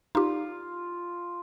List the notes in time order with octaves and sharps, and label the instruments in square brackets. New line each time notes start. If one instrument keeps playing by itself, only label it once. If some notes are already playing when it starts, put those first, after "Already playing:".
[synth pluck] D#4 G4 [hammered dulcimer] F4